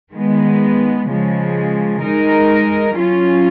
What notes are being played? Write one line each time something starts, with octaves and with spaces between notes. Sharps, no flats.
D#3 G#3 B3
C#3 F3 G#3
G#3 D#4 A#4
F#3 C#4 F4